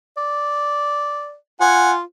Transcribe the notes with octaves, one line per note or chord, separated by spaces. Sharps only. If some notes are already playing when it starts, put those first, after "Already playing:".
D5
F4 F#5 G#5